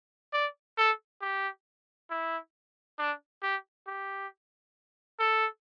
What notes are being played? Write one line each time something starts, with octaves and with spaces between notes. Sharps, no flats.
D5
A4
G4
E4
D4
G4
G4
A4